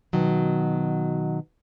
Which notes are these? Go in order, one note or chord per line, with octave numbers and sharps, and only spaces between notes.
B2 D#3 F#3